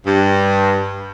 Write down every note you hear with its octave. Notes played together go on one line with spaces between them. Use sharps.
G2